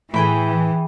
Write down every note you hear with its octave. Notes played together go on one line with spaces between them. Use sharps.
A2 E3 G#4 G5 B5